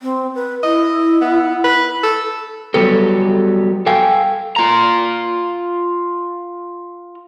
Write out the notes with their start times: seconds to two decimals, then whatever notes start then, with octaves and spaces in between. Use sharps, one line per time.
0.01 C4
0.35 B4
0.63 E4 D#5
1.21 B3
1.64 B4
2.03 A4
2.74 F#3 G3 B3 G4 A4
3.86 A4 F5 G5 G#5
4.56 F4 A#5